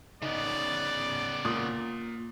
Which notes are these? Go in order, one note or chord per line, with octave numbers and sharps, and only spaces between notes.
C#3 B3 D#4 D5
A#2 D#6